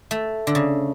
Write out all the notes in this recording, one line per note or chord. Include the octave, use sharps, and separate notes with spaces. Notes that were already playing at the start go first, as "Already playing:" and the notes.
A3
D3
C#3